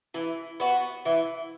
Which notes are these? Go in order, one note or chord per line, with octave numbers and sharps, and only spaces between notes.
E3
B3 F#4
E3